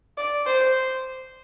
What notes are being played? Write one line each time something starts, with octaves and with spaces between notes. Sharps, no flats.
D5
C5